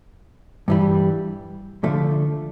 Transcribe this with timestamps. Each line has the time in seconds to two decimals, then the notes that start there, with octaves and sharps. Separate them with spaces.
0.68 G2 E3 G3
1.83 D3 F3 A3